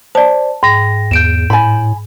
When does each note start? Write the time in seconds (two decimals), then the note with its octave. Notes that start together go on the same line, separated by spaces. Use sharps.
0.15 C5 D5 A5
0.63 G#2 G5 A#6
1.11 E2 G6 D7 E7
1.50 A2 G#5 B5